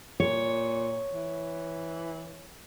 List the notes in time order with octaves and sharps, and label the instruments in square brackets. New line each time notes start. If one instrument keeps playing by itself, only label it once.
[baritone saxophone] A#2 [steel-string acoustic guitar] C#5
[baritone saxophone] E3